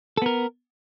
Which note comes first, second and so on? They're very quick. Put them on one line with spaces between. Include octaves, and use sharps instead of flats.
A4 B3 A#4